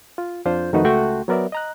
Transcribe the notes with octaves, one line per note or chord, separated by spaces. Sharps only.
F4
F2 D4 F4 C5 G6
F2 D#3 A3 D#4 F#4 B4
C#2 A3 F#4 G5 C6 C#6
F#3 B3 A#4 D5 E5
D#5 A#5 F#6